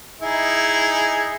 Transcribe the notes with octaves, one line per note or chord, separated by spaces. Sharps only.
D#4 E4 G#4